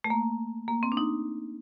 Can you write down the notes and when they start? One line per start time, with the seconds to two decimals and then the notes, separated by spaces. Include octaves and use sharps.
0.04 A3
0.10 A#3
0.68 A#3
0.83 C4
0.92 D4
0.97 D#4